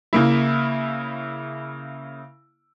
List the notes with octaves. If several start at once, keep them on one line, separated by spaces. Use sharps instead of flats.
C#3 A#3 E4